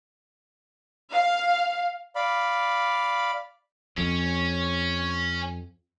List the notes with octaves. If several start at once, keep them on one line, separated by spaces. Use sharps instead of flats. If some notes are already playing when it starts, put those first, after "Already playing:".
F5
D5 F5 B5
F2 C#4